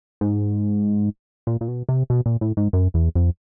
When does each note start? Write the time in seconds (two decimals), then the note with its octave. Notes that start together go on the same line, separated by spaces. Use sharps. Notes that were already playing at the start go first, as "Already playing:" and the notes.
0.21 G#2
1.47 A#2
1.61 A#2
1.68 B2
1.89 C3
2.10 B2
2.26 A#2
2.41 A2
2.57 G#2
2.73 F#2
2.94 E2
3.15 F2